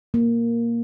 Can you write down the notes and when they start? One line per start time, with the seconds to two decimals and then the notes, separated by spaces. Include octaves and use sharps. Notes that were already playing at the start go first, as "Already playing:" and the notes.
0.14 A#3